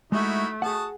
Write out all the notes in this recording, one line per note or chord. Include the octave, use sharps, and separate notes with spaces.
G#3 A3 D#4 E4 F#4
F#4 G#4 F#5 A5 D#6